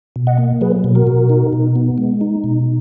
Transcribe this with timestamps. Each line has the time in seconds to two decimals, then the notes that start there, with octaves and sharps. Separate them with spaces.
0.16 B2
0.27 D#5 F#5
0.38 A#3
0.61 F#3 G#4 B4
0.84 B2
0.95 F#4 A#4
1.07 B2
1.29 D#4
1.53 B2
1.76 B3
1.98 G#3
2.21 D#4
2.44 B2